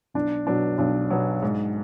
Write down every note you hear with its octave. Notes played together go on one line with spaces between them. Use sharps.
B1 D4
B2 F#3 B3 D4
B1 D4
B2 F#3 B3
G#2